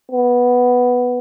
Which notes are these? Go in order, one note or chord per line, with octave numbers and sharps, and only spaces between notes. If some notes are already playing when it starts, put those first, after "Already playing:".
B3